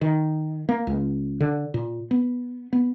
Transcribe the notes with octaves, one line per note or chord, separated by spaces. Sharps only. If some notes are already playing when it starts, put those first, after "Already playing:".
D#3
A#3
C#2
D3
A#2
B3
B3